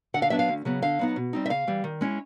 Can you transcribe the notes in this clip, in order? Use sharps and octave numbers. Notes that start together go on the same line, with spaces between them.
D3 F#5
F5
F#3 B3 D4 E5
F5
D2
C#3 F#3 B3
D3 F5
F#3 B3 D#4
B2
G3 C4 D#4
E5
C#3 F5
E3 G3
D#3
G#3 C#4 E4